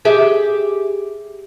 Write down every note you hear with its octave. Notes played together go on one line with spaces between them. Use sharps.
G4 G#4 E5